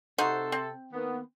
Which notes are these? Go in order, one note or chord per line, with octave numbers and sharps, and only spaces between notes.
C3 D#4 F#4 A4 C5
C4
D#3 A#3 B3